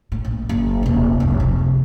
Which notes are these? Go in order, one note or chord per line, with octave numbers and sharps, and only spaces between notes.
A2
A#1
F#1
D#1 C3
F1 C#2
C3 F3